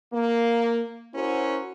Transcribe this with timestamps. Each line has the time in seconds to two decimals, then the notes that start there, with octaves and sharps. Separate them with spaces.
0.13 A#3
1.14 C#4 E4 F#4 A#4 C5